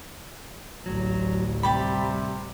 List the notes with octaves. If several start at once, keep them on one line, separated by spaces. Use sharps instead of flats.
A1 D2 F#3
C3 G3 G4 B5